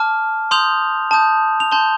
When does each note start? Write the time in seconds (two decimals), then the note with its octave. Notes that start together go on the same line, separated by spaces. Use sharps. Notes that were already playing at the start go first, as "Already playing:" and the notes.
Already playing: A5 D6 F6
0.51 C6 D#6 G6 F7
1.11 A5 D#6 G6
1.60 F7
1.72 A5 C6 G6 G7